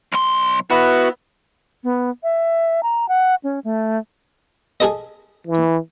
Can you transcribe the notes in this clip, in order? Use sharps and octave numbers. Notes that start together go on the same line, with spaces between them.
B1 C6
B3 E4 F#4 B4
B3
E5
A#5
F#5
C#4
A3
G#4 A4 D#5
E3